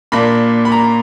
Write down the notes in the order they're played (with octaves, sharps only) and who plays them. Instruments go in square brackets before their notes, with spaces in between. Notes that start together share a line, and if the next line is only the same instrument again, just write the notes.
[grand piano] A#2 A#3 D4 B5
B5
A#5